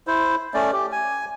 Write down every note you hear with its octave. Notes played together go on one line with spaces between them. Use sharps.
E4 C5
A3 C#4 D5
G4
G#5